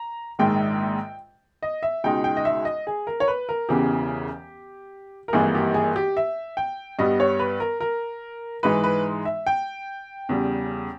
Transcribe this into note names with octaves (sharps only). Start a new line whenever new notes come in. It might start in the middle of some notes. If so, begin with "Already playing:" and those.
Already playing: A#5
A#1 G#2 D#3 G#3 G5
D#5
E5
C#2 B2 G#3 D#4 G5
G5
D#5
E5
D#5
G#4
A#4
C#5
B4
A#4
E1 E2 C#3 E3 G4
A#4
G#1 G2 E3 A#3 G#4
G4
G#4
G4
E5
G5
G2 G3 B3 D#5
C#5
B4
A#4
A#4
G#2 E3 G#3 D#4 B4
B4
E5
G5
E2 C#3 G3